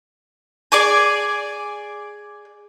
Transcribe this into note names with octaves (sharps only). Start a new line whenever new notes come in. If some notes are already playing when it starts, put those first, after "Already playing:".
G#4 D5 G#5